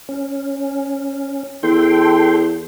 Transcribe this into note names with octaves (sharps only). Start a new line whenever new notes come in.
C#4
E2 A4 G5 C6